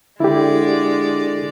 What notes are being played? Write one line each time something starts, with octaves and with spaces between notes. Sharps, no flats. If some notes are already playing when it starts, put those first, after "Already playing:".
D3 G#3 E4 G4 D5